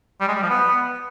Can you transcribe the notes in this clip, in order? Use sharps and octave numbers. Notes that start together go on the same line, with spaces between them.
G3
G#3
G3
F3
B3